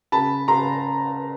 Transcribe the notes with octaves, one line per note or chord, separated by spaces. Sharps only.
C#3 A5 B5
C#3 A#5 C6